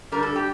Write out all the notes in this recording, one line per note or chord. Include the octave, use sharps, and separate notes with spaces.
D3 G3 D4 A#4
A4
G4